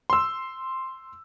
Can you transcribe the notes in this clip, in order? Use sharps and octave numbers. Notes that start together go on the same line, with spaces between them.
C6 E6